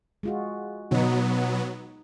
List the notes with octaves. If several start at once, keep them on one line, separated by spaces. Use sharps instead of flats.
G#3 F4 F#4
B2 F#3 B3 D#4